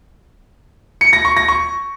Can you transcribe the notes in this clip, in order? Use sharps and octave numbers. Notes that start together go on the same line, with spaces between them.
C#7
A#6
C#6
A#6
C#6